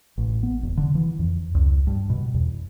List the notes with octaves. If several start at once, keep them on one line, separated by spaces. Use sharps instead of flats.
A1
B3
E1
D3
E3
F2
C#2
G2
B2
E2